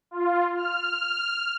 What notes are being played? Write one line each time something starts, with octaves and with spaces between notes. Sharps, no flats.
F4
F6